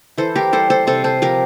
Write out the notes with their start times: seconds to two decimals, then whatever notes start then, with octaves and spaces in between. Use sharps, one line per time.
0.18 E3 A4 C5
0.36 G4 A#4
0.53 G3 A4 C5
0.70 A4 C5
0.87 C3 A4 C5
1.04 A4 C5
1.22 F3 G4 A#4